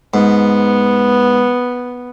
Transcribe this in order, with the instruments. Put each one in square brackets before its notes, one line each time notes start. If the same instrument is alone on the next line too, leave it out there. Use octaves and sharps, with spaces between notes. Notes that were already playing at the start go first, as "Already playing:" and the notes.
[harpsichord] G#2 [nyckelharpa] B3